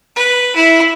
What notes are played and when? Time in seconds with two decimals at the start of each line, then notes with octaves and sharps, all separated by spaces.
0.16 B4
0.55 E4